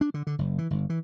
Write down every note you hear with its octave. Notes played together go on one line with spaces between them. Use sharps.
D4
D3
D3
F#1
E3
G1
E3